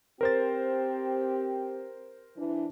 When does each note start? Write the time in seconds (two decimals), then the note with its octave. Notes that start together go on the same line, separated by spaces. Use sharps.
0.21 C4 G4 A#4 C5 A6
2.36 E3 D4